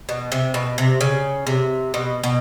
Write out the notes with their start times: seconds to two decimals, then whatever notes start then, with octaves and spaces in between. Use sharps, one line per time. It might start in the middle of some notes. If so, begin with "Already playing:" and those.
0.09 B2
0.32 C3
0.54 B2
0.78 C3
1.01 C#3
1.47 C3
1.94 B2
2.24 B2